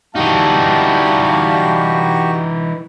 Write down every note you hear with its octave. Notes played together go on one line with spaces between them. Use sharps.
E3 G3 D#4 F#4 G4 F5 A5